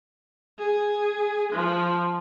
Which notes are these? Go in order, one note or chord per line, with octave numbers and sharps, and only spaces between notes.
G#4
F3